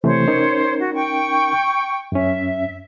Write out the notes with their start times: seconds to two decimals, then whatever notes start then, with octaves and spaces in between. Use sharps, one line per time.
0.04 C3 E3 A3 C5 C#5
0.28 C#4 D#4 A#4
0.79 F#4
0.93 G5 C#6
2.12 F#2 C#4 E5